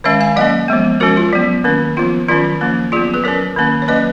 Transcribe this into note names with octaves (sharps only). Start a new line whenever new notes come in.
D#3 G#3 C#4 C#5 F5
F5 G#5
F#3 A#3 C#4 D#5 F#5
F3 G#3 B3
F3 G#3 C#4 F#4 A#4
F4
F#3 B3
D#3 A#3 C#4
F3 B3 F4
D#3 F#3 C#4 F4
F3 A#3 C#4
F#3 B3 F4 G#4
G#4 B4
F#3 C#4 A#4 C#5
D#3 A#3 C#4
C#5
F#3 A#3 C#4 B4 D#5